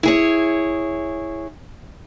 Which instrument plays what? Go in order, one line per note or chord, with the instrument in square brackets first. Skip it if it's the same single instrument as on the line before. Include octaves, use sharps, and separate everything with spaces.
[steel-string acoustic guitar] E4 G#4 C#5